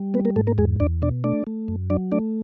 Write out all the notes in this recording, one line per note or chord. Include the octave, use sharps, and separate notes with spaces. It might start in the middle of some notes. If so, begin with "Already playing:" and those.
Already playing: G3
A#3 B3 B4
A#3 A#4
G#2 A3 A4
A#3 A#4
E2 G#3 G#4
E2 D4 D5
B2 D4 D5
A3 D4 D5
A3
F#2
F#3 D4 D5
A3 D4 D5